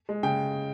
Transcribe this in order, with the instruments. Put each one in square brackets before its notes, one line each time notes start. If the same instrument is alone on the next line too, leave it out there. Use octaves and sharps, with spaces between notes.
[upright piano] G#3
C#3 G5